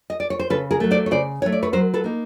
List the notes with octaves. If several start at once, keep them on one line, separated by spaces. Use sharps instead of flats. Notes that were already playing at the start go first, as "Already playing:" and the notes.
D#5
D5
C#5
C5
C#3 A4 B4
G#4 A#4
F#3 A3
C5 D5
C#5
C#3 C5 D5
F#3 A3 C#5
D5
B4 C#5
F#3 A#4 C5
A4 B4
A#3 D#4